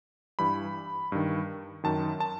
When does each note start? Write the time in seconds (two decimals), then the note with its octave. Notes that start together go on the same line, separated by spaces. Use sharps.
0.39 G2 E3 B5
1.12 G2 D#3
1.84 F#2 D#3 A5
2.20 A5